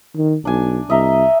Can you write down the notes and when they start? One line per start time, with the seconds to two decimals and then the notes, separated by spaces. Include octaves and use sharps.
0.16 D#3
0.45 B1 D4 G#5
0.90 C2 D#5 E5 A#5